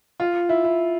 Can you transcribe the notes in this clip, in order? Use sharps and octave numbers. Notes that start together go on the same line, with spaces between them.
F4
E4
E4